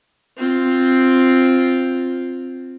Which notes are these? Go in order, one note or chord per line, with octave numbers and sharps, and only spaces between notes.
C4 F4